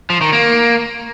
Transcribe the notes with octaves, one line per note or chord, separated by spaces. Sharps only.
F3
D#3
A#3